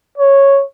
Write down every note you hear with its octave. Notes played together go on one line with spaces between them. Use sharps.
C#5